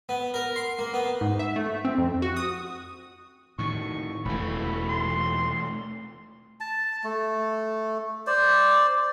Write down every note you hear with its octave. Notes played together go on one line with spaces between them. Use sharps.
B3
A#4
C6
A#3
B3
G#2
E5
A3
C4
F2
F#4
D#6
A2 D#3 C#6
E1 C2 E3 A3 B5
C6
A5
A3
C5 D5